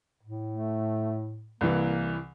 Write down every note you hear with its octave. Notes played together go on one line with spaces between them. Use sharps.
A2
A3
C2 E3 A#3